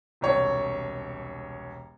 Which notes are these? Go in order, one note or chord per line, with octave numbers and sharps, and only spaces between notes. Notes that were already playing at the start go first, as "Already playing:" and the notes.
E1 C2 C#5